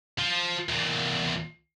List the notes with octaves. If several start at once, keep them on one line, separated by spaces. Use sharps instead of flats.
F3
E2 A#2